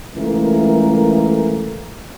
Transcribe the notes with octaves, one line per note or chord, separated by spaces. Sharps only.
C#2 E3 A3 A#3 A#4